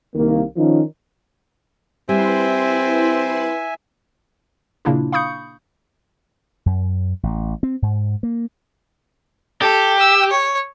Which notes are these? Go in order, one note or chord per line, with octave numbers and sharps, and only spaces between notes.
C2 D#3 A#3
D#3 F3 C#4 D#4
G3 C4 E4 B4 E5 G#5 C6
A#2 C#3 A#3 D4 E4 F4
F5 B5 C#6 D#6 G6 C#7
F#2
A1
C4
G#2
A#3
G4 A4
E6
C#5